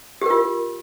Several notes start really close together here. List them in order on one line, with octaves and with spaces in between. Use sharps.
G4 A#4 F4